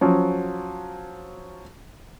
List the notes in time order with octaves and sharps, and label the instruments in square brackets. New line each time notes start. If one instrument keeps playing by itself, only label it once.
[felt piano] F3 F#3 C#4